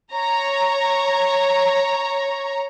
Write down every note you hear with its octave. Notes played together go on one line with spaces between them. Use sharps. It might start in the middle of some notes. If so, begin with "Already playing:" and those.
C#5 A#5